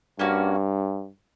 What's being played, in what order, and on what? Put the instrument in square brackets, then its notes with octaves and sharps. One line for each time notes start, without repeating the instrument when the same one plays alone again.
[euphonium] G2 [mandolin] A#3 C#4 F#4